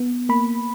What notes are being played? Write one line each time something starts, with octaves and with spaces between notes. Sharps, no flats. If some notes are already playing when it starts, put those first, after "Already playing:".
Already playing: B3
A#3 B5